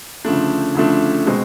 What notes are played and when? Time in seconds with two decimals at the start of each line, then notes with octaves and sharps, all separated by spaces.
0.25 D2 C#3 F3 A3 D4
0.75 D2 C#3 F3 A3 D4
1.27 B2 G#3 C4